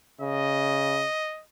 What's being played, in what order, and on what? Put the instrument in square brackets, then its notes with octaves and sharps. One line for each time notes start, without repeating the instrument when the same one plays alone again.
[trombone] C#3 [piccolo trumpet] D#5